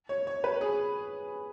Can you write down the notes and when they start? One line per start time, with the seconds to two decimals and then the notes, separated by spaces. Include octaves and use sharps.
0.09 C#5
0.27 C#5
0.44 B4
0.61 G#4